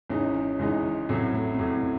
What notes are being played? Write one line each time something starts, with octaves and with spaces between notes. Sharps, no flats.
G#1 G#2 E3 G#3 C#4 D#4
C#4
G#1 G#2 E3 G#3 D#4
A1 A2 F#3 C4
A3
C4
A1 A2 F#3 A3
C4